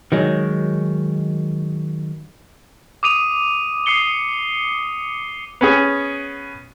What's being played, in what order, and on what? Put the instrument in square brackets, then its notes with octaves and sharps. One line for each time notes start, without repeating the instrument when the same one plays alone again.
[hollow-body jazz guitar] D#3 F#3 G#3
[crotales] D6 D#6 D#7 F7
D#6 C7 C#7 G7
[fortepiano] B3 C#4 G#4